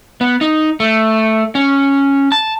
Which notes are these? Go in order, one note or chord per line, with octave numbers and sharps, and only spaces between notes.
B3
D#4
A3
C#4
A5